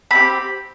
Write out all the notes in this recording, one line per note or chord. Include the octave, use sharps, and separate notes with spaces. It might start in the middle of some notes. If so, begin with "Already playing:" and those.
C4 E4 G4 B5